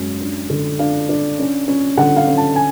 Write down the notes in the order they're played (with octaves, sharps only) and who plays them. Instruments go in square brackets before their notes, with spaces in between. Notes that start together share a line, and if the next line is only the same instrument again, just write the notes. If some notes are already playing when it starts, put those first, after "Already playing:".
Already playing: [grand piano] F#2 G#3
D4
D3
D4 F5
D4
C#4
C#4
D3 F#5
F5
C#4
A5
G#5